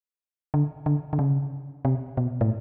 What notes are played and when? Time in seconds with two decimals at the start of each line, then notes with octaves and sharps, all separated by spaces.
0.54 D3
0.86 D3
1.13 D3
1.19 C#3
1.85 C3
2.17 B2
2.41 A2